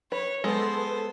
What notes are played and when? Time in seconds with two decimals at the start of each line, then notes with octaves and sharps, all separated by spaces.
0.12 B4 C#5
0.44 G#3 B3 A4 B4 C5